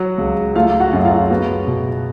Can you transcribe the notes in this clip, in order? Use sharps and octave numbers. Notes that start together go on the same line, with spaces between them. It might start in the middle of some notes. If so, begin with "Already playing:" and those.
Already playing: F#3 F#4 F#5
C#2
A3 F4 F5
F#4 F#5
F#2
F4 F5
B3 F#4
B2